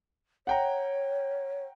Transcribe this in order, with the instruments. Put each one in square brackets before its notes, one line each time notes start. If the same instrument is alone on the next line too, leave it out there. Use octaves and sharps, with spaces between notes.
[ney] C#5 [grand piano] F#5 G5 A#5